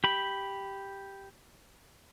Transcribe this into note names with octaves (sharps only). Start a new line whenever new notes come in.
G4 B5